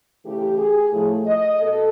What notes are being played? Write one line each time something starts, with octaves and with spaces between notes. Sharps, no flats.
C#3 E3 A3 G4
G#4
A2 F3 A3
D#5
B2 A4